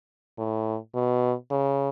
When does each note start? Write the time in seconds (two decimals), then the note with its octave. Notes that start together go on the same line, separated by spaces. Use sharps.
0.38 A2
0.95 B2
1.51 C#3